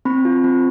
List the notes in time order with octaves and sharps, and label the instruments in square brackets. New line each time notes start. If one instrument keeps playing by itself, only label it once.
[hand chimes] C4 B5
F4
C4